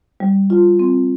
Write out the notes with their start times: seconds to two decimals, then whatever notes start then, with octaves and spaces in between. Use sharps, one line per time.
0.20 G3
0.50 F4
0.79 C4